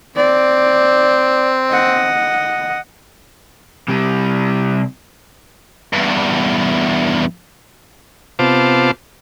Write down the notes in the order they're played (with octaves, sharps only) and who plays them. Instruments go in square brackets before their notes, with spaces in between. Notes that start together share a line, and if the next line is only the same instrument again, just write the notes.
[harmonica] C4 [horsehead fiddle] D5
[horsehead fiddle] D#5 F#5
[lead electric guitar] C3 G3
[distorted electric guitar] E2 G2
[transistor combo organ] C3 B3 F4 C5 A5 D6